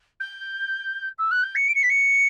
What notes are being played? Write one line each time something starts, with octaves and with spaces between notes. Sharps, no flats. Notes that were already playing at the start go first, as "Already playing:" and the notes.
G6
E6
F#6
G6
C#7
D7
C#7
B6
C#7